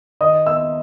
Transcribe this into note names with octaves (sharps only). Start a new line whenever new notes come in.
D#3 D#5 D#6
B3 E5 E6